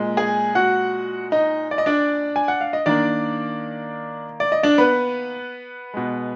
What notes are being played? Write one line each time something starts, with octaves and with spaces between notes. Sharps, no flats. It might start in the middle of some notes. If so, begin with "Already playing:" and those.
Already playing: A#2 G#3
G#4 G#5
F#4 F#5
D#4 D#5
D5
D#5
D4 D5
G#5
F#5
F5
D#5
D#3 A#3 D4 D5
D5
D#5
D4 D5
B3 B4
B2 G#3